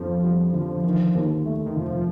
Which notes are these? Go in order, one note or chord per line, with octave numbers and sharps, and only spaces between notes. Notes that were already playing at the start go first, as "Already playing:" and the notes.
Already playing: F2 F3 D4
G3
D3
D#3
D#2
A3
D#3
F1 F3